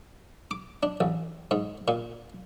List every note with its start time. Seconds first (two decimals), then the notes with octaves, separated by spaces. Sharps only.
0.51 D6
0.83 D4
1.00 A1
1.51 G#2
1.88 A#2